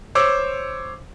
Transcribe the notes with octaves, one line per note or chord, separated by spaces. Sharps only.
C5 C#5 D6 E6